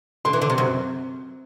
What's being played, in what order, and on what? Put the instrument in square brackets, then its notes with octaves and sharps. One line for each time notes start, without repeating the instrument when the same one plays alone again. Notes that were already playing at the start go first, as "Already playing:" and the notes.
[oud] D3 [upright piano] C6
[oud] E3
D3
C3
F#2